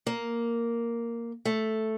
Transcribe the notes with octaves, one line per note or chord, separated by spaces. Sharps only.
A#3
A3